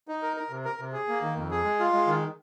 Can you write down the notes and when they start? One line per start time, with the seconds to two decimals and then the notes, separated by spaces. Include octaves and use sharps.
0.08 D#4
0.22 A#4
0.36 A#4
0.50 C3
0.65 A#4
0.79 C3
0.93 G#4
1.08 A#3
1.22 D#3
1.36 F2
1.51 G#4
1.64 G#3
1.80 F4
1.93 G#3
2.07 D#3